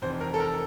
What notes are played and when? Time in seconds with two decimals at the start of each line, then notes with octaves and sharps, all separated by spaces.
0.02 F1 F2 E3 C5
0.20 A#4
0.34 A4
0.40 A#4